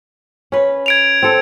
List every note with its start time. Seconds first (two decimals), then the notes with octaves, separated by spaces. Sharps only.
0.52 C#4 B4
0.86 G#6 D7 F7
1.23 C4 A4